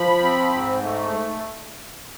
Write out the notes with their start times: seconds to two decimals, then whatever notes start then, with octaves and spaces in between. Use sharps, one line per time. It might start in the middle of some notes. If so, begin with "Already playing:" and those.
Already playing: F3 B5
0.23 C4
0.53 G#2
0.83 A3